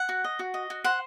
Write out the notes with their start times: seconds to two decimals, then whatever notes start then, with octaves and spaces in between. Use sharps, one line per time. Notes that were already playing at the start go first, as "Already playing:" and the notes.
Already playing: F#5
0.09 F#4
0.24 D#5
0.39 F#4
0.54 D#5
0.70 F#4
0.84 C5 F#5